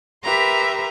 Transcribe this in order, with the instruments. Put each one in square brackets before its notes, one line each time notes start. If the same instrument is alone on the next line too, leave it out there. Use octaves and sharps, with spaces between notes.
[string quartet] G4 A#4 B4 E5 A#5 C6